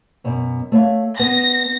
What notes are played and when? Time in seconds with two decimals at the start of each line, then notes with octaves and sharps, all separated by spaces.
0.24 F#2 B2 F#3
0.72 A3 C#5 F5
1.19 B3 A#6